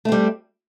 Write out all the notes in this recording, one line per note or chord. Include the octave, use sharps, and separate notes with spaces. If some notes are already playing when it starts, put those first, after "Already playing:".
G3 A3 C4